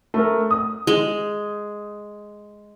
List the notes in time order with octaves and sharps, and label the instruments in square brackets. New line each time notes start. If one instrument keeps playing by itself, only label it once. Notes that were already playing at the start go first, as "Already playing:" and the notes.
[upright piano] A3 A#4
D#6
[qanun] G#3